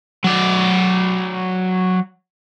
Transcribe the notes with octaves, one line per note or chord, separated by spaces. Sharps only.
F#3 D5